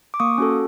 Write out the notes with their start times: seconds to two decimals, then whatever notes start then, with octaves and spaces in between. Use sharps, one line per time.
0.14 D6
0.20 A#3 C#6 D#6
0.38 C#4 F#4 A4